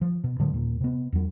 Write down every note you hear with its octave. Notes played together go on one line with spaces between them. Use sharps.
F3
B2
A2 D3 F#3 G#3
D#1 A#2
C3 B3
E2 F#3